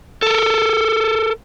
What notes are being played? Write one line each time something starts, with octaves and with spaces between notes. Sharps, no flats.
A4 A#4